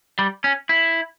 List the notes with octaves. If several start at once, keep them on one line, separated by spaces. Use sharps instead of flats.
G3
C#4
E4